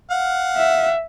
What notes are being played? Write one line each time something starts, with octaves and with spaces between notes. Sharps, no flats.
F5 F#5
E5